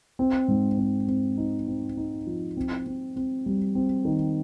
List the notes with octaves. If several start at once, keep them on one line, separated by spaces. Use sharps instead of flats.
C4
G#2
C4
C4
D#4
C4
D#4
F3
C4
C4
C4
G3
C4
D#3